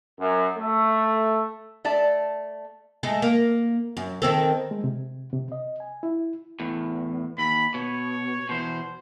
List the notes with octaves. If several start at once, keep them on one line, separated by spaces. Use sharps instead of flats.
F#2
A3
A3 D5 A5
G#3 A3 A4
A#3
F#2
D#3 C4 A4
G#3
C3
C3
D#5
G#5
E4
E2 A2
D#2 B5
B2 C#5
E2 B2 C5